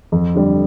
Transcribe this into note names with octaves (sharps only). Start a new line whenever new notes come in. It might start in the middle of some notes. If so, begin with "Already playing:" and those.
F2
D3 G3